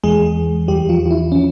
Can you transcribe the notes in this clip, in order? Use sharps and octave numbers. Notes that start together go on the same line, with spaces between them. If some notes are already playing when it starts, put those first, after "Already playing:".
E2 E3 G#3 G#4
E2 E3 G3 G4
F3 F4
F4
E4
F3 C#4